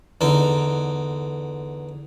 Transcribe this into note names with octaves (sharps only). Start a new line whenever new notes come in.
E2 D3 D#4